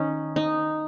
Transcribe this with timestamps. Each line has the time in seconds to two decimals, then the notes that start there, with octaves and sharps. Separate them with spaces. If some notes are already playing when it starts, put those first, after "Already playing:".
Already playing: D#3 C#4 D#4
0.36 D#4